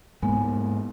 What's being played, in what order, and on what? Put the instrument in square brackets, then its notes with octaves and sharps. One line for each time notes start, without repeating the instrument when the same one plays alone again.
[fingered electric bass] G#2 G#3 A#3 [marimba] B3 G#5